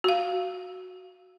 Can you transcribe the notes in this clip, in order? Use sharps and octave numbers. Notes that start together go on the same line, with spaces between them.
F#4 F5